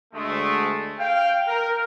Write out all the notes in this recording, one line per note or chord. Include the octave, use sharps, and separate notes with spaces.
D2 G#3 A3
F5 G5
A#4